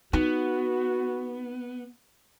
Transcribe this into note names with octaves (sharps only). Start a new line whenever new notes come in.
B3 D#4 F#4